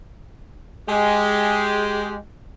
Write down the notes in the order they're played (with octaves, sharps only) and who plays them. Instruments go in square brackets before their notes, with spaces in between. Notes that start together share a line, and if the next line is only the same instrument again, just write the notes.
[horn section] G#3 G4